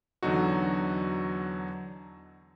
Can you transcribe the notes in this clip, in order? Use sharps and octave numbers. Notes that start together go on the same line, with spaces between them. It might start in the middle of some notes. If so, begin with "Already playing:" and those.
E2 D3 F#3 D#4 F#4